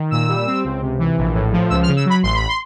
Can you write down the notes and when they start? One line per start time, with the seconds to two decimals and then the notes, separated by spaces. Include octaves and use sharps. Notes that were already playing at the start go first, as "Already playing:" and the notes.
Already playing: D#3
0.11 A#2 E6
0.29 G3
0.46 C4
0.64 C#2
0.82 C3
0.99 E3
1.18 A#1
1.34 A2
1.53 F3
1.70 C#2 E6
1.83 F6
1.88 C#3
1.96 E6
2.05 F#3 B5
2.23 A1 C6
2.35 B5
2.49 C6